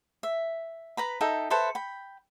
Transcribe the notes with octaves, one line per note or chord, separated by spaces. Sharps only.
E5
B4 A#5 B5
D#4 A4 E5 G5
A4 B4 C5 E5
G5 B5